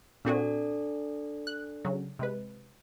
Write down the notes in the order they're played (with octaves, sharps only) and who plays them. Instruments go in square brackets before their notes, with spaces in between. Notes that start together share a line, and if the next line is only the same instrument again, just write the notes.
[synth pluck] A#2 C4 F#4 [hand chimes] D4 A4 D5
[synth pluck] F#6
C#3 F#3
C3 G#3 B4